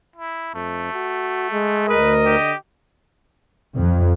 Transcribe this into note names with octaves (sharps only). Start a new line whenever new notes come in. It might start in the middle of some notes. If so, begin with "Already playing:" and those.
E4
F2 A3
F#4
G#3
D2 A#4 B4 D#5
D3 G4
F2